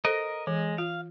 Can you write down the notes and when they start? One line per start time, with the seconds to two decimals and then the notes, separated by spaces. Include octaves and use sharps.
0.05 A4 A#4 C5 D#5
0.47 E3 G#3
0.78 F4 F5